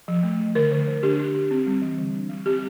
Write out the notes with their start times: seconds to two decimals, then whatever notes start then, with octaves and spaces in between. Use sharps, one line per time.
0.08 F3
0.23 A3
0.40 F3
0.55 D3 A#4
0.71 D3
0.88 D3
1.03 D4 G4
1.19 D4
1.35 D4
1.51 C4
1.67 G3
1.82 E3
1.98 D3
2.15 D4
2.29 G3
2.46 C4 G4